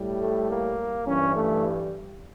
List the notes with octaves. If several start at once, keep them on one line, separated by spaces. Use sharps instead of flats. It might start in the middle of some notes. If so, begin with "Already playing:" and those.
Already playing: A2 G3
A3
A#3
G2 E3 G3 C#4
A3